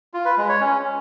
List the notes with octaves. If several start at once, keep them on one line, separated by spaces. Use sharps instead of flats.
F4
B4
G#3
C#5
C#4